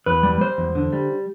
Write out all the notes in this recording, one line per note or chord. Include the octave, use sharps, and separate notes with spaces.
E2 B4
G3
G3 C5
E2
D3
G3